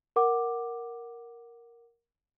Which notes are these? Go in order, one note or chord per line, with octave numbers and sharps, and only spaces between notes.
A#4 F#5 D6